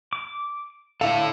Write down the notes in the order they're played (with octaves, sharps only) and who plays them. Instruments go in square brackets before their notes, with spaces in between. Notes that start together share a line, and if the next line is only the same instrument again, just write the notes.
[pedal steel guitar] D6
[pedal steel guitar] D3 F5 [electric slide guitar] E4 A4